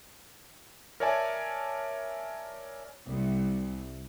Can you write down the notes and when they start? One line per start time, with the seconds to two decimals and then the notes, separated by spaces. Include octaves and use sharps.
1.00 A#4 C#5 D5 E5 G#5 A5
3.07 C2